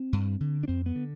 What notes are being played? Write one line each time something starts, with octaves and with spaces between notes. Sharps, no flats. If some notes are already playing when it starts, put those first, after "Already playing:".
Already playing: C4
G2
D3
D4
F2 C4
B3
D3